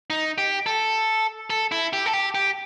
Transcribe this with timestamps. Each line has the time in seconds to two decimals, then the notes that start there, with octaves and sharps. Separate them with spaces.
0.10 D#4
0.38 G4
0.66 A4
1.50 A4
1.72 E4
1.93 G4
2.06 A4
2.13 G4
2.35 G4